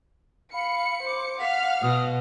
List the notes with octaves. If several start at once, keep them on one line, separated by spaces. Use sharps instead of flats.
F5 B5 C#7
C5 D6
F5 F#5 F6 B6
B2 D#6